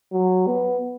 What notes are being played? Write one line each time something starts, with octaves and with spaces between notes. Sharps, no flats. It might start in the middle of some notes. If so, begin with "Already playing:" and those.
F#3
B3